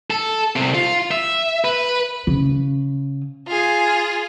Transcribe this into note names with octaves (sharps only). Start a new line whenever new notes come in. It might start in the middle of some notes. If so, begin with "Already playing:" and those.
A4
C2 C3
F4
E5
B4
C#3
F4 G#4